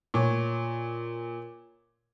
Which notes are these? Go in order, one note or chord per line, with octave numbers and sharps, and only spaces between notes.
A#2 C#5